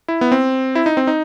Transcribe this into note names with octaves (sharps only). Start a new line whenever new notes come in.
E4
B3
C4
E4
D#4
C4
D#4